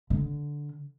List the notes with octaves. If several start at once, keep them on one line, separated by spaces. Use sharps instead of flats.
D3